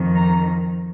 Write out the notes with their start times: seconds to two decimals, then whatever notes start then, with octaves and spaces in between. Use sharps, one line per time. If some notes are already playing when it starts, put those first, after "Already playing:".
Already playing: F2 D#3
0.16 A#5